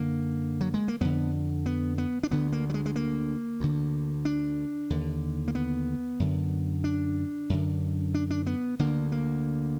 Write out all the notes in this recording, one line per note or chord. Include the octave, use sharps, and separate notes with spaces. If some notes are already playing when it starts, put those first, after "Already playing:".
Already playing: F#2 D3 A#3
F#3
G#3
A#3
F2 D3 B3
B3
B3
D4
D2 D3 B3
A#3
F#3
G#3
G#3
A#3
D2 D3
D4
D#2 D3
A#3
B3
F#2 D3
D4
F#2 D3
D4
D4
B3
D2 D3 A#3
A#3